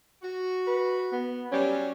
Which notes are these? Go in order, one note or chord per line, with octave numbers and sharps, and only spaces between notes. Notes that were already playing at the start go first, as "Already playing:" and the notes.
F#4
B4
B3
F#3 G3 C#4